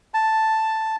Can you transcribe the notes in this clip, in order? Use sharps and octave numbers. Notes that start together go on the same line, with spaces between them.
A5